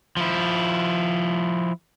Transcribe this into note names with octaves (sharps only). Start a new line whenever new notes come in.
F3 E4